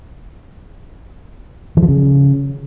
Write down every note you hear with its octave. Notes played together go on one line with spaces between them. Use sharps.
E3
F3
C#3